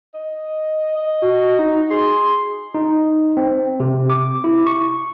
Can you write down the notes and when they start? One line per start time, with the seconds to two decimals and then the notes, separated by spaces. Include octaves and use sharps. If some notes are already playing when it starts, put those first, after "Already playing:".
0.14 D#5
0.97 D#5
1.22 F#4
1.59 D#4
1.90 G#4 C6
2.75 D#4
3.37 C4
3.80 C3
4.10 D6
4.44 E4
4.67 C#6